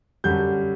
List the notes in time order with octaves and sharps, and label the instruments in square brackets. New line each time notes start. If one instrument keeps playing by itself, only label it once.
[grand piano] F#2 D3 G3 G6